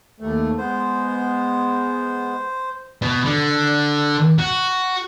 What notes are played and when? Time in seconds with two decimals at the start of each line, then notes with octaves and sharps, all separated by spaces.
0.20 D#2 A3
0.58 G#3 B3 C5
3.02 B2
3.25 D3
4.39 F#4